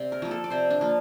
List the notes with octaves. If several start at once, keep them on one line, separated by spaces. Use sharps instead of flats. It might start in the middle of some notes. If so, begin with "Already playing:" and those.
Already playing: C3 C5 D5 F5
A#4
F3 A#3
A4
D5
C3 C5
D4
F3 A#3